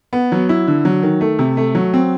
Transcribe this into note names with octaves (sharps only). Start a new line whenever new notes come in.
B3
F#3
E4
D3
F#3
D#3
A3
C3
A3
F#3
C4